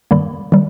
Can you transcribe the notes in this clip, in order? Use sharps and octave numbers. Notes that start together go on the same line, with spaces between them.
G2 D#3 G3 A#3 B5
D#3 G3